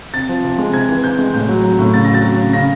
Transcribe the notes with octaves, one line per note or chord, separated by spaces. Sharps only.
C3 A6
F3
C3
G#3
C3 G#6
E3
C3 G6
G#3
A2 G6
F#3
F#3
A2
C#3 A6
F#3 A#6
A6
F#3
C#3
C#3 A#6